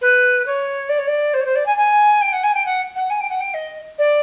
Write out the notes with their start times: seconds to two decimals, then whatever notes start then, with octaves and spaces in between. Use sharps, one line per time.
0.01 B4
0.45 C#5
0.88 D5
0.98 C#5
1.06 D5
1.33 C5
1.40 C#5
1.45 C5
1.55 D5
1.65 G#5
1.76 G#5
2.21 G5
2.32 F#5
2.43 G#5
2.54 G5
2.65 F#5
2.95 F#5
3.09 G#5
3.20 G5
3.29 F#5
3.40 G5
3.53 D#5
3.98 D5